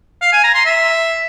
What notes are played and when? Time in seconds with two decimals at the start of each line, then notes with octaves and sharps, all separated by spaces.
0.22 F5
0.33 G#5
0.43 A#5
0.54 C6
0.65 E5